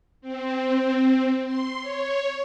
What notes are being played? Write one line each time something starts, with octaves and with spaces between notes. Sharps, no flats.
C4
C6
C#5